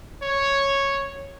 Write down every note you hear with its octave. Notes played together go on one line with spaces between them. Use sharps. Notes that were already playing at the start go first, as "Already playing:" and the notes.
C#5